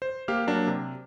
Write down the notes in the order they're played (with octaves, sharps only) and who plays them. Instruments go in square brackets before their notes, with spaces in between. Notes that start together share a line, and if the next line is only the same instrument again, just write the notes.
[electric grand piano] C5
A#3 G4 F5 F6
F#3 A#3 D4
C3